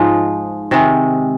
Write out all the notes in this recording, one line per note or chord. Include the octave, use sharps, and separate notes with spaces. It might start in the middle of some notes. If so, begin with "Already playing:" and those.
Already playing: G#2 F3 G#3 D#4 F4
C3 D#3 G#3